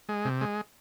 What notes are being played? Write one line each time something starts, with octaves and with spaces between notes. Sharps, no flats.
G#3
C3
G#3